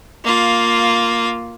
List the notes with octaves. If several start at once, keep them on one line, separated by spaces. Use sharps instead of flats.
A#3 F4